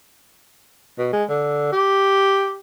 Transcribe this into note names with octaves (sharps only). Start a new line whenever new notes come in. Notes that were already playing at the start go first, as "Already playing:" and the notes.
B2
G#3
D3
G4